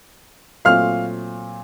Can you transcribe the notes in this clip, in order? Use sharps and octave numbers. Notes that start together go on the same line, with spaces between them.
A#2 F#3 A3 C4 F5 F6